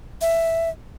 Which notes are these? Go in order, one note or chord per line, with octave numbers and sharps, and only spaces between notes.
E5